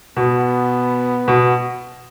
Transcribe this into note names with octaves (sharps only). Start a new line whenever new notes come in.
B2 B3
B2